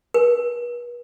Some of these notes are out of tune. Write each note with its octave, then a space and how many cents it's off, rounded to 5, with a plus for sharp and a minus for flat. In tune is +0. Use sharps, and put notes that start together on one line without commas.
B4 -40